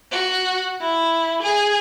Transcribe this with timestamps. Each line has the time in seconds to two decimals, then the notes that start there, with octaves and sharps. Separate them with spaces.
0.10 F#4
0.81 E4
1.42 G#4